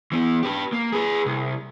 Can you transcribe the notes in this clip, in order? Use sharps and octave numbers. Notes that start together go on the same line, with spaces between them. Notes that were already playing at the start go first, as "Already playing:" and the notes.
E3 B3
G4 B4
A#3
G#4 B4
C2